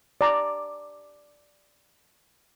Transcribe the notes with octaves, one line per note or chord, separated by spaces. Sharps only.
D5 A#5